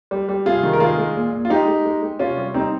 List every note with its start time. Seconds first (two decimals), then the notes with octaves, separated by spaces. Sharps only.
0.11 G3
0.29 G3
0.46 C3 F4 G#4
0.63 D#3
0.73 A#4
0.80 G#3 F4 G#4
0.98 G#3
1.15 A#2
1.32 A#2
1.45 F4
1.50 G#3 D#4 G4
1.68 G#3
1.85 G#3
2.02 G#3
2.19 C3 C#4 F4
2.37 G3
2.54 G3 C4 D#4